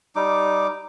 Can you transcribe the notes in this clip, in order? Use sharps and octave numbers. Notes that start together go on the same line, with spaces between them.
G3 D#4 D6